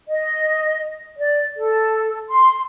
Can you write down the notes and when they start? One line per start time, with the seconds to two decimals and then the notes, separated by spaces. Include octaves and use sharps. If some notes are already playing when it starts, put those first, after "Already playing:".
0.07 D#5
1.17 D5
1.57 A4
2.29 C6